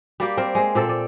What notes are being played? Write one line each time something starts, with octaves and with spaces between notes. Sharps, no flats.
G3 A#3 G4
C4 A#4
G#3 C4
A#2 C4 A4
D5